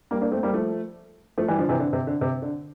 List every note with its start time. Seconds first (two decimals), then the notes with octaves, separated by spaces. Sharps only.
0.11 G3 A#3
0.21 A#3 D4
0.32 A3 C4
0.43 G3 A#3
0.53 F3 A3
1.38 F3 A3
1.48 E3 G3
1.58 D3 F3
1.69 C3 E3
1.79 D3
1.93 C3
2.07 D3
2.21 C3
2.42 D3